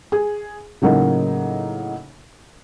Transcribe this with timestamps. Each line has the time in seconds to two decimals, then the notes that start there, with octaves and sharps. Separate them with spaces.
0.12 G#4
0.82 A2 C#3 F#3 A#3 D#4